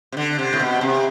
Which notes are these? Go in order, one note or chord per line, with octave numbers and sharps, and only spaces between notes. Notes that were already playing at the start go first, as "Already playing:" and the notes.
C3
D3
C3
A2
B2
C3